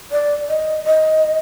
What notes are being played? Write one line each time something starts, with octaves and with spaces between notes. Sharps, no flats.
D5
D#5
D#5